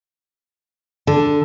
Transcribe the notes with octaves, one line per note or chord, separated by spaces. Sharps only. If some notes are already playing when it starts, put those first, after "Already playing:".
D3